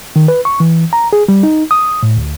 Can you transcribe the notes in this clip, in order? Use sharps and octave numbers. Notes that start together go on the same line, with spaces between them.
D#3
B4
C#6
E3
A#5
G#4
G3
D#4
D#6
A2
D2